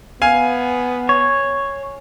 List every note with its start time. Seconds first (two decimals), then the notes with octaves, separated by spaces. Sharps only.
0.22 B3 F5 G#5
1.09 C#5